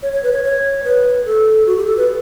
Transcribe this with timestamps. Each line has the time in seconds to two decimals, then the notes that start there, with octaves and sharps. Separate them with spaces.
0.03 C#5
0.13 C#5
0.23 B4
0.33 C#5
0.44 C#5
0.84 B4
1.26 A4
1.67 F#4
1.77 G4
1.87 A4
1.97 B4